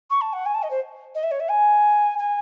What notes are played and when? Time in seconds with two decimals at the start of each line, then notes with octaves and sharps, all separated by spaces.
0.10 C#6
0.21 A5
0.33 F#5
0.46 G#5
0.54 A5
0.63 D#5
0.71 C5
1.15 D#5
1.23 E5
1.31 C#5
1.40 E5
1.49 G#5
2.19 G#5